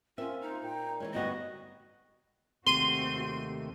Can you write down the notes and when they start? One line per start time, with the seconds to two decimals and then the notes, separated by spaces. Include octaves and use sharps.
0.18 A#3 C4 C#4 F4 E5
0.41 D#4
0.63 A#2 G5
1.00 E3 F3 G#3 C#5
1.13 D2 G2 B3 F#4 D#5
2.67 D#2 C3 A3 C4 F#4 C6 D#7 G7